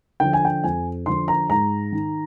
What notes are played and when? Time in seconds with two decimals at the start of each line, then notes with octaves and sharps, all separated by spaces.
0.20 D3 F3 G5
0.33 G#5
0.45 G5
0.64 F2 G#5
1.06 D3 F3 C6
1.28 A#5
1.49 G#2 A#5
1.92 D#3